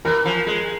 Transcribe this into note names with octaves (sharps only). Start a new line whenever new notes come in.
E3 A#4
F3
G#3